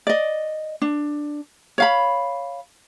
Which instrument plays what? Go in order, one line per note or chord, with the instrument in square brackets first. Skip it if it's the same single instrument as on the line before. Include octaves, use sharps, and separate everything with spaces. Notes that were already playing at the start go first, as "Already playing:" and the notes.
[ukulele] D5 D#5
D4
C#5 F5 B5